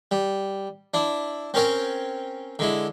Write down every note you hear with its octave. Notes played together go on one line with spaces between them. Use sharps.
G3
D4 E4
C4 C#4 A#4 C#5 G5
D3 G#3 E4